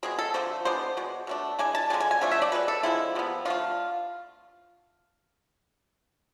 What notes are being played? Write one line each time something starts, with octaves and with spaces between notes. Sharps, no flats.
B2 G#3 C4 G#4
A4
D3 F3 A3 C4 C5
E3 G#3 B3 D4 C5
B2 G#3
B2 A3 D4
E3 G#3 D4 G#5
A5
D3 G#3 B3 D4 G#5
G#5
G#5
D3 F3 A3 D4 G#5
E5
D5
B2 G#3 C4 B4
A4
D3 F3 G#3 C4 E4
C3 F3 B3
D3 F3 A3 F4